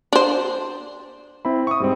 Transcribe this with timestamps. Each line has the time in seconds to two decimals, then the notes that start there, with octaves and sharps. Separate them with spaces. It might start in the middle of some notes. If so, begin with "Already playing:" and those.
0.13 D4 C5
1.45 C4 E4 B5
1.67 C#6 D#6
1.80 G#2 G3 C4